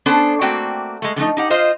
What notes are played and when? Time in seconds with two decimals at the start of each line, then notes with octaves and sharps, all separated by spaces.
0.06 B3 C#4 D4 A4 C5
0.41 A3 A#3 C4 F#4 D5 G5
1.02 G#3 A3
1.16 D3 F3 A3 D#4
1.37 D#4 G4 F#5
1.50 F4 C5 D#5 F5